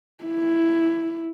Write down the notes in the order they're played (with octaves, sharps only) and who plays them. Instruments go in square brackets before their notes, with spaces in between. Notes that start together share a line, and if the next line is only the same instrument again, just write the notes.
[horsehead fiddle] E4